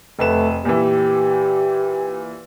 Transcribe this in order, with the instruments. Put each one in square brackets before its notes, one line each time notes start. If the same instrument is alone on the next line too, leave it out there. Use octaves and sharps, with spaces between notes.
[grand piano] F1 B4 E7 [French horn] A3
[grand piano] A#2 E3 [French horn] G4